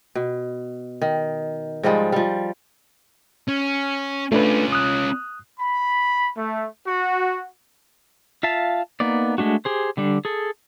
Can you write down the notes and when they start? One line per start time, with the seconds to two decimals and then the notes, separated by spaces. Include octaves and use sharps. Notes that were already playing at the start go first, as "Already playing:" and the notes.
0.15 B2
1.02 D#3
1.83 G#2 F3 G3 G#3
2.12 F3 G3
3.49 C#4
4.32 A3 C#4 D4 F4 B4
4.72 D#6 F#6
5.60 B5
6.37 A3
6.87 F#4
8.43 F4 E5 F5 A5
9.00 A#3 B3 D#4 D5
9.38 G#3 A3 D4 F#4
9.65 G4 G#4 C5
9.97 D3 G3 D4
10.25 G#4 A4